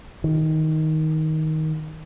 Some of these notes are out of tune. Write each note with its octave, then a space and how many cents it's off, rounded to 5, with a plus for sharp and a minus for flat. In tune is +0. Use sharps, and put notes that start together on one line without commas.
D#3 +10